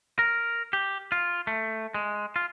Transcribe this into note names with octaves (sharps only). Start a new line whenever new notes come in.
A#4
G4
F4
A3
G#3
F4